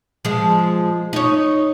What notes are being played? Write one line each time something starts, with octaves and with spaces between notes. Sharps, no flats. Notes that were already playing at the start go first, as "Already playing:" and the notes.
F3 G#3
D#4 C#5